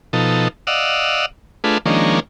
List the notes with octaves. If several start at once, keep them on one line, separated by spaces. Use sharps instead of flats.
B2 F3 D#4 A4
D5 D#5 F5 F#5 E6
A3 D4 F4 G#4 B4
D#3 F3 G#3 A#3 C#4 D4